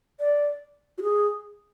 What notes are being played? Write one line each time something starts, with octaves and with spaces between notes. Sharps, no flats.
D5
F#4
G#4